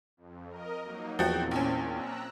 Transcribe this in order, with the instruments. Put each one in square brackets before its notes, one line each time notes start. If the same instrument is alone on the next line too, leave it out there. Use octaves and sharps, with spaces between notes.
[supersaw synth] F2
A#4 D#5
F#3 A#3 D#4
[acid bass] E2 [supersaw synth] A#2 C4 [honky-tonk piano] F3 F#4 G5
[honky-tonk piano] A#1 C#4
[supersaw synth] A#5 E6 F#6